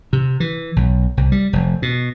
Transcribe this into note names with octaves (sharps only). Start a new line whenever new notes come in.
C3
E3
B1
C2
G3
F1
B2